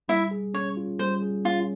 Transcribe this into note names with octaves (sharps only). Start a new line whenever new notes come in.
G3 E4 E5
G#4
C#4 C#5
F4
G3 C5
G#4
C#4 F4